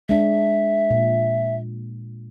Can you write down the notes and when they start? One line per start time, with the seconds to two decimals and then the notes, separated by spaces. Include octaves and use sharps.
0.09 G#3 D4 E5
0.91 A#2